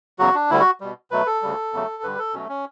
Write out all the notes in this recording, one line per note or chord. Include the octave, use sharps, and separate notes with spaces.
E2 C#3 F#3 F#4
D4
D2 D3 G3 E4
F#4
B2 G3
B2 F#3 A3 B4
A4
D2 C#3 G3
E2 C#3 F#3 A3
G2 D3 G3 B4
A4
B2 F#3 A3 C#4
C#4